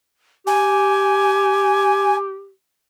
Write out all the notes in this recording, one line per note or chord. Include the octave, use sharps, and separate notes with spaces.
G4 G#5